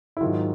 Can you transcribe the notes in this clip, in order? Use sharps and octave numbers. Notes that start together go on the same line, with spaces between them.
E4
G#2 D#3 F#3 F4